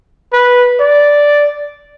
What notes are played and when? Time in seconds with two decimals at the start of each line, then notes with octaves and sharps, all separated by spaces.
0.33 B4
0.80 D5